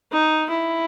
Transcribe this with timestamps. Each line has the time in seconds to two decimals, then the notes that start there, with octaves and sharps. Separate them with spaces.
0.12 D#4
0.50 E4